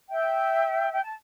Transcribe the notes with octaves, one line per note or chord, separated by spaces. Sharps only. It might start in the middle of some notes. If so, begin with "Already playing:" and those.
E5 G5
G5
A5